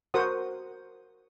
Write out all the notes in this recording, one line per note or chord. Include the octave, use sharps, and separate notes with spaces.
F#4 A#4 C5 F#5 D#6